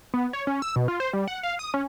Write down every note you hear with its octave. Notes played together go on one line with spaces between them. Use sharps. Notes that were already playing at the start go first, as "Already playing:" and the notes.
B3
C#5
C#4
E6
B2
F4
C5
G3
F#5
F5
D#6
C#4